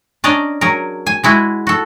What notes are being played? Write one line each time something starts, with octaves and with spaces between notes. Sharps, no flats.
C#4 D4 D5 D#5 A#5
F#3 G#4 A#4
G#5
G#3 E4 F#4 G#4
F#4 A4